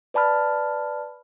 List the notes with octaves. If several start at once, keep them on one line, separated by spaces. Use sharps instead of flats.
B4 D5 A5 B5 F6